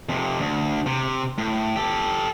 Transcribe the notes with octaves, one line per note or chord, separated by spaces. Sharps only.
F2 C3
D2
C3
A2
G4 A4